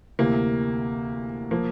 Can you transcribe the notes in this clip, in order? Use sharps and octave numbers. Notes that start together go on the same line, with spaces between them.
D2 C3 E3 A#3
F3 A#3